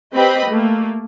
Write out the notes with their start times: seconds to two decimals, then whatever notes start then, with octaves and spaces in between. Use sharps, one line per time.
0.15 C4 G4 B4 D#5 G5 B5
0.48 A3 A#3